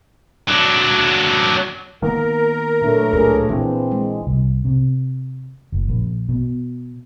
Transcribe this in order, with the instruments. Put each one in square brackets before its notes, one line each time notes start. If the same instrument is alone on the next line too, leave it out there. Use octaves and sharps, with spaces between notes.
[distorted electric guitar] F#3 D4
[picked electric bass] D#3 A#3 B3 [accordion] A#4
[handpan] A#2 D4 [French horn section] E3 F#3 A3
[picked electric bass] C#2 A2 [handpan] D4 G#4
[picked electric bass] A#1 A#2 [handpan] E3 [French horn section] C4
[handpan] G#3
[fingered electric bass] C2
C3
F#1
A#1
B2